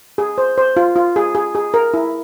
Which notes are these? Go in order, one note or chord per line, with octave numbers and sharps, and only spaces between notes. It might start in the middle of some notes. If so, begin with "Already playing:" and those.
G#4
C5
C5
F4
F4
G#4
G#4
G#4
A#4
E4